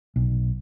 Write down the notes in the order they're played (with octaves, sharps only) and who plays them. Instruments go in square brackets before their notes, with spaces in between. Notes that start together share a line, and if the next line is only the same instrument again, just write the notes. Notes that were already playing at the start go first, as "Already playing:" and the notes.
[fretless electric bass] B1